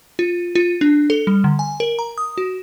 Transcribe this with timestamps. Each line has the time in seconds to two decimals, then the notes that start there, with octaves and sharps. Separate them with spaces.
0.19 F4
0.55 F4
0.81 D4
1.10 A4
1.27 G3
1.44 D3
1.59 G#5
1.80 A#4
1.99 A#5
2.18 D#6
2.38 F#4